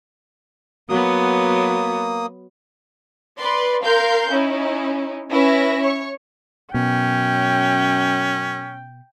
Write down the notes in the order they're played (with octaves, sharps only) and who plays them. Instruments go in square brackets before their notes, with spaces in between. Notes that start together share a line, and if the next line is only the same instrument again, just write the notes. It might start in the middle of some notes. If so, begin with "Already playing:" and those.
[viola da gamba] F#3 B3 [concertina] A#3 D#6
[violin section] B4 D5 C6
A#4 F5 C6 G6
C#4 D#4 E4
C#4 E4 B4 E5 A#6
C#5 C#6
[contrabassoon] F#2 [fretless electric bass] B2 [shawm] C#4 [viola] G5